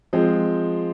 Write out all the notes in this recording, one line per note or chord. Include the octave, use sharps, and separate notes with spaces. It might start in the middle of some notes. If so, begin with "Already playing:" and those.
F3 G#3 C4